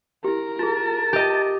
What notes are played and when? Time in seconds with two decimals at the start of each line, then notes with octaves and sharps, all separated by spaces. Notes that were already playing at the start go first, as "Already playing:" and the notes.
0.24 E4 G4 A#4
0.59 F4 G#4 A5
1.13 G4 D#5